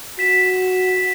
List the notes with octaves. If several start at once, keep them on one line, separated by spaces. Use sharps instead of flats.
F#4 B6 E7